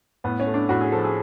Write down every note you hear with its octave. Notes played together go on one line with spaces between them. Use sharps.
A2 B3
C#4
A3
D4
A2 F#4
G#4
F3 A4
G#4